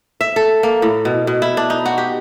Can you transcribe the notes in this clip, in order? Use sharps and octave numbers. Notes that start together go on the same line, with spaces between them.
E5
A4
A#3
A2
B2
B2
E4
D4
D#4
F#4
G4